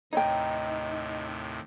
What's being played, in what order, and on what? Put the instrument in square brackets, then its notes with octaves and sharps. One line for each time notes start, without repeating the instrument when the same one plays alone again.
[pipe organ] D#2 A2 C3 [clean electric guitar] D#4 [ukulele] C#5 G5